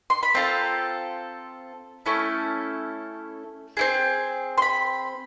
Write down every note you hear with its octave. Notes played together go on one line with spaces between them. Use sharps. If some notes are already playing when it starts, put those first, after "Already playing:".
C6
B5
C4 F4 A4 A#5
A3 C#4 E4 A4
C4 E4 G#4
C6
B5